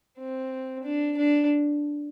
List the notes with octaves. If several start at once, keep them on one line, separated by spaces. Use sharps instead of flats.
C4
D4
D4